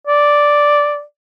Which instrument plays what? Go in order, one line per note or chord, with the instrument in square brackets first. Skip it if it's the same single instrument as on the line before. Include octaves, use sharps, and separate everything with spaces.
[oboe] D5